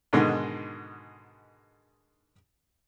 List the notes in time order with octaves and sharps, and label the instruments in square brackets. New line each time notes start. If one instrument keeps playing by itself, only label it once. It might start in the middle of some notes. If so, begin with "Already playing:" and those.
[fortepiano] G#2 B2 D3 D#3 G#3